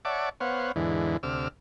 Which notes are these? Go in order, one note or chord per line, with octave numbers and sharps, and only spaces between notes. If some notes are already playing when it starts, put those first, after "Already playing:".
C#5 D5 E5 F#5 A5 D6
B3 C5 C#5 F5 F#5
E2 G#2 D3 E3
D2 C3 D6 E6 F6